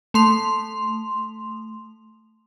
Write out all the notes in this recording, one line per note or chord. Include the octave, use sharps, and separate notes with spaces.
A3 C6 F7